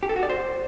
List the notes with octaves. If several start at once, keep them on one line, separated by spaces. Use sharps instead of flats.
G4
A4
F#4
D5
C5